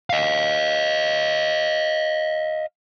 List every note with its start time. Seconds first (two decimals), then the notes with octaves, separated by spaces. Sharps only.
0.10 D#5 F5